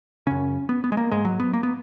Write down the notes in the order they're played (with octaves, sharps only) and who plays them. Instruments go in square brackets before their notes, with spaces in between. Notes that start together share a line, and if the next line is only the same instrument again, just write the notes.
[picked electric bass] F#2 C#3 C#4
B3
B3
G#3
A#3
G#2 G#3
F#3
B3
A#3
B3